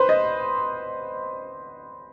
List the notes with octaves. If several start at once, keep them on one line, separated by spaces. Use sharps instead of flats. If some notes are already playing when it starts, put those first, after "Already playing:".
Already playing: B4 C5
D#5